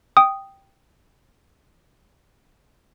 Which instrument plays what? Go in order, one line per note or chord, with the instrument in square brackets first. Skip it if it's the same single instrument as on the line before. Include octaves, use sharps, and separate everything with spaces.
[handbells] G5 D#6